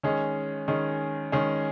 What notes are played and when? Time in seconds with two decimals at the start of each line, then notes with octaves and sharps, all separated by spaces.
0.03 D#3 G#3 C#4 G#4 C#5
0.68 D#3 G#3 C#4 G#4 C#5
1.32 D#3 G#3 C#4 G#4 C#5